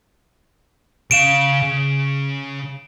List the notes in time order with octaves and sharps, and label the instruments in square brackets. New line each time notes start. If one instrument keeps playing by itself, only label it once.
[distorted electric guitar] C#3 F5 [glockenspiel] D7 E7
[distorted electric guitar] C#3